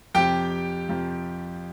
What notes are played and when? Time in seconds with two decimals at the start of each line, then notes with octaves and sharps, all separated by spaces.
0.15 F2 C3 F3 G4 G5
0.89 F2 C3 F3